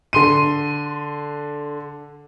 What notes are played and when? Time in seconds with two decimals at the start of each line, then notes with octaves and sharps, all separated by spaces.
0.13 D3 C6 D#7